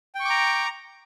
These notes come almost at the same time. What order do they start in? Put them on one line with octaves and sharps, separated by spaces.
G5 C#6 D6 A#5